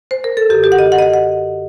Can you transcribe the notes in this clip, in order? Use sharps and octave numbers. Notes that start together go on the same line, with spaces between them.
C5
A#4
A4
F#2 D3 G4
G4
F#5
D#5
F#5
D#5
F#5
F#5